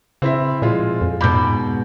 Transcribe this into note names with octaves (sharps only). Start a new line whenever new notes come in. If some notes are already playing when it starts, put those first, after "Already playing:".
C#3 C4 E4 E5
A#2 F3 G#3 F4
F2
G#2 B2 B5 D6 G6